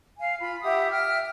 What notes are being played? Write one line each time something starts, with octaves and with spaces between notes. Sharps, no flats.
F5 G#5
F4 B5
G4 E5 F#5 D#6
E5 G5 F6